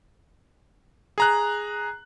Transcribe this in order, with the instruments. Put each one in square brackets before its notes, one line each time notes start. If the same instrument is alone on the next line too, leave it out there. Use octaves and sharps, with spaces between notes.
[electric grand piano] G#4 A#5 F#6